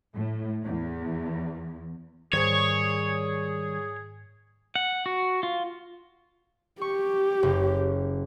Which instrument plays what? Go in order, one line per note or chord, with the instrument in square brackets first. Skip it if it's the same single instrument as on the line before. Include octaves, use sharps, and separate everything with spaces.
[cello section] A2
E2
[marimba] G#2 C5 G#6 [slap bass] D#3 G3 [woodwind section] G#4 [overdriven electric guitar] C#5
[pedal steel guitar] F#5
F#4
F4
[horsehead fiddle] G4 [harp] C#6
[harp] F#1